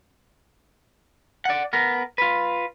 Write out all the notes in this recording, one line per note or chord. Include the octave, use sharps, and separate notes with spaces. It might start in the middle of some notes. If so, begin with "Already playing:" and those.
D5 F#5
B3 A#4
F4 B4